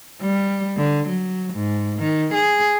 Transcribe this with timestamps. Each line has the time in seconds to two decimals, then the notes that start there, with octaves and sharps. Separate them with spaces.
0.21 G3
0.77 D3
1.08 F#3
1.53 G#2
1.99 D#3
2.33 G#4